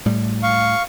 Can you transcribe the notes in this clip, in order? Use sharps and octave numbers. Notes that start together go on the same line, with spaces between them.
A2 G3
F5 C#6